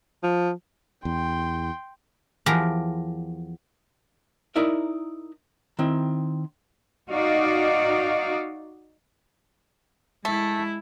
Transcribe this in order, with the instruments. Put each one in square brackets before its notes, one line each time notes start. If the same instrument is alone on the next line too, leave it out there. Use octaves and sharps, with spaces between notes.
[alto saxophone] F3
[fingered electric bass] E2 [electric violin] G5 C6
[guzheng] E2 F3 G4 A#4 A#5
[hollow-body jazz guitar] D#4 E4 A#4 D5 E5
D#3 C4 E4
[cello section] D#4 F#4 D5 D#5 F5
[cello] G#3 E4 [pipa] A3